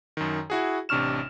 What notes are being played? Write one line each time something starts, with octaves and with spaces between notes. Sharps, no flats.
F#2 D#3
E4 F#4 G#4
A1 C3 D4 C#6 F6 E7